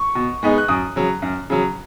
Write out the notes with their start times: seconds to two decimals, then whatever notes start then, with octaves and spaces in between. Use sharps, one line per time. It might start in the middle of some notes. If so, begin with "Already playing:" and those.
Already playing: C#6
0.15 B2
0.43 G#3 B3 D#4
0.58 F#6
0.68 F#2 D#6
0.96 C#3 F#3
1.22 F#2
1.50 C#3 F#3